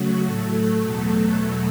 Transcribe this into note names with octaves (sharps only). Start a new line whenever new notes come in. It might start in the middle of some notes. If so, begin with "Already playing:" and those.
Already playing: C#3 F#3 A3 F#4
A2 F#3 A3 A4
E2 B2 F#3 A3 A4